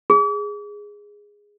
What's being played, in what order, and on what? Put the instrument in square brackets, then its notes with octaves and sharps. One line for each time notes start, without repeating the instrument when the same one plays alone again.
[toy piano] G#4